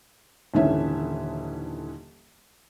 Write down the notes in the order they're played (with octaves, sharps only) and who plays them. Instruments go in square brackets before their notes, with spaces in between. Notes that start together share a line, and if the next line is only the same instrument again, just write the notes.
[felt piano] D#1 G#2 D3 E3 C#4 E5